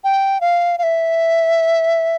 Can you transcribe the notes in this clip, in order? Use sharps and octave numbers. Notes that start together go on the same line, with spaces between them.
G5
F5
F5
E5